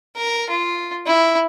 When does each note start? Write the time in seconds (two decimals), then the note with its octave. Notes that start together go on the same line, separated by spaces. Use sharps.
0.16 A#4
0.49 F4
1.06 E4